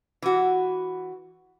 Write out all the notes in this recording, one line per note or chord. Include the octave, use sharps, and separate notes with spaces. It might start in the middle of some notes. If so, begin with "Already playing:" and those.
E3 F#4